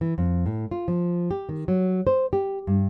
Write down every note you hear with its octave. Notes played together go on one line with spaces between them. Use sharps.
E3
F2
A2
F4
F3
G4
D#3
F#3
C5
G4
G2